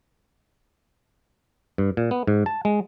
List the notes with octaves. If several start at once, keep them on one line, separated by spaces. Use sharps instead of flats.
G2
A#2
B3
G#2
A5
G#3